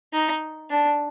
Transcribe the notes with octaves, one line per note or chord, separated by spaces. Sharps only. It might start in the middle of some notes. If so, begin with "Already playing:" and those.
D#4
D4